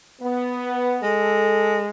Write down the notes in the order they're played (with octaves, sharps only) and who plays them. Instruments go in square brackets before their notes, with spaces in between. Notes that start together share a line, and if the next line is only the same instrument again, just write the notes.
[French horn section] B3
[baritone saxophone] G#3 [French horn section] A4